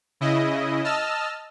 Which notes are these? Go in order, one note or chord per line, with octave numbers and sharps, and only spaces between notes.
C#3 E4 D#5
D#5 A5 E6 F6